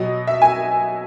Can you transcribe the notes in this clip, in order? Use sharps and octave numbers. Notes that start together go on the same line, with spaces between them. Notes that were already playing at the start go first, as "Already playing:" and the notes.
Already playing: B2 F#3 D#5
E5
G#5